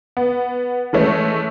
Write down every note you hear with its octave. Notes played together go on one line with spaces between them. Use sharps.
B3
E3 G#3 A3 C#4